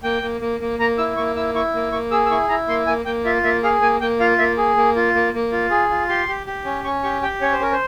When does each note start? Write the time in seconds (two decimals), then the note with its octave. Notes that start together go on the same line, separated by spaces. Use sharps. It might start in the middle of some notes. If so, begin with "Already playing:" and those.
0.03 A#3 G5
0.22 A#3
0.41 A#3
0.60 A#3
0.79 A#3 A#5
0.98 E4 E6
1.16 A#3 C#6
1.36 E4 E6
1.54 E4 C#6
1.74 A#3
1.92 A#3 C#6
2.11 G#4 E6
2.26 E6
2.30 E4 C#6
2.49 E4 A#5
2.68 A#3 C6
2.87 A#3 G#5
3.06 A#3 G5
3.24 F4 E5
3.43 A#3 E5
3.63 G#4 F5
3.81 A#3 G#5
4.01 A#3 G5
4.20 F4 F5
4.39 A#3 E5
4.57 G#4
4.77 A#3
4.96 F4
5.15 A#3
5.34 A#3
5.52 F4
5.70 G#4
5.89 F4
6.09 G4 C6
6.28 G4
6.47 G4
6.65 C#4
6.84 C#4 C#6
7.03 G4 C#6
7.22 G4 G5
7.41 C#4 C#5
7.52 C5
7.60 C#4 A#4
7.72 C5